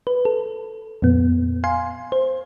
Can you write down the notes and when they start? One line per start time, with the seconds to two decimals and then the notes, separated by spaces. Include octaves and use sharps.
0.07 B4
0.25 A4
1.02 F2 A#2 B3
1.64 F5 G#5 C6
2.12 C5